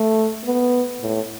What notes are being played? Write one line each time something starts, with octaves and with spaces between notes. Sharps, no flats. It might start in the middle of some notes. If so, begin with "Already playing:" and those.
Already playing: A3
B3
A2